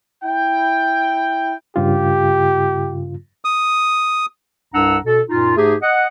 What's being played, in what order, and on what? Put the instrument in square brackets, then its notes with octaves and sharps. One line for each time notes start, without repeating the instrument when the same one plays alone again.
[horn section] E4 G5
[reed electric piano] G2 C#3 F4 [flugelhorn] G4
[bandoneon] D#6
[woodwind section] C2 G2 D4 F#5 A#5 E6
B2 A4
F#2 A#2 D#4 F4
G#2 A3 D#4 G4 G#4
D#5 F#5